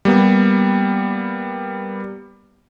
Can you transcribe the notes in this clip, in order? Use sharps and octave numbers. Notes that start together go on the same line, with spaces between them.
G3 A#3 B3